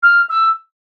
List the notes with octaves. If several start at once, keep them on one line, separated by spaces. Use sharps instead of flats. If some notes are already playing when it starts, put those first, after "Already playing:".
F6
E6